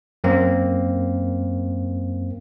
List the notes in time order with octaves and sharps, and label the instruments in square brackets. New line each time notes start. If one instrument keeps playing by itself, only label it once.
[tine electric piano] F#2 A#3 C4